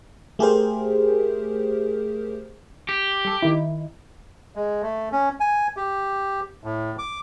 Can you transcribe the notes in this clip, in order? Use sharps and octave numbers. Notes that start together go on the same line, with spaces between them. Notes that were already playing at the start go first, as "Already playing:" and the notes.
A3 G4 G#4 A#4 C5
G4
G3 A4
D#3 D#4 E4
G#3
A3
C#4
G#5
G4
A2
D6